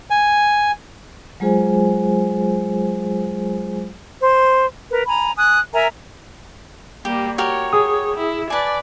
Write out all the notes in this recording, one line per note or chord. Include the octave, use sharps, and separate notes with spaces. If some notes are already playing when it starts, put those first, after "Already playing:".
G#5
F#3 G#3 F4 G#4 C5 G#5
C5
A#4 B4
G#5 A#5 B5
G#5 D#6 F#6
A#4 E5 G#5 A#5
G3 A#3 G4
F#4 G4 A#4 C#5
G#4 D#6
E4
B4 D5 G#5 A5